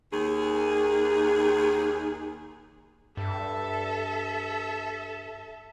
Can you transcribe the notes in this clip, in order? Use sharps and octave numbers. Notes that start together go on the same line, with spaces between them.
D#2 G#4
G2 A4 E5